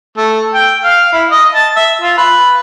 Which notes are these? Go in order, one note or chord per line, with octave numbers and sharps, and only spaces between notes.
A3
G5
F5
E4
D#5
A5
E5
F4
B4